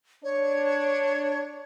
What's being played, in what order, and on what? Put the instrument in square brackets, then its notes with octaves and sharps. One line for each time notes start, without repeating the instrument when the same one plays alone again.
[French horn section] D4 [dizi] C#5